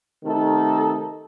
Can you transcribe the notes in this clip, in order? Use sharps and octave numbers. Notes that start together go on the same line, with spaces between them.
C3 D#3 A3 D#4 A4